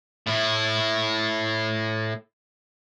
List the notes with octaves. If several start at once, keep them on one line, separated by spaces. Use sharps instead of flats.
A2 E4